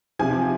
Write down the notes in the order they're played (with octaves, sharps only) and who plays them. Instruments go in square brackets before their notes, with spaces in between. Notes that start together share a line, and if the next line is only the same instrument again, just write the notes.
[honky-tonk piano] C3 F3 G#5